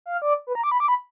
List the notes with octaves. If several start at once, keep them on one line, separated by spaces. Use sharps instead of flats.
F5
D5
B4
A#5
D6
B5
D6
B5